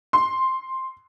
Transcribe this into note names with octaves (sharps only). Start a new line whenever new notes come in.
C6